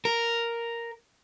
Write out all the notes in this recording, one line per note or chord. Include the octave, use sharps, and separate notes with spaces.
A#4